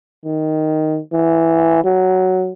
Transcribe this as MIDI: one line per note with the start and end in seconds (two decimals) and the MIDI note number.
0.25 0.99 51
1.13 1.80 52
1.84 2.53 54